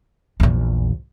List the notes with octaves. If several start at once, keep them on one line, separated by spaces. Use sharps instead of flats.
A#1 E2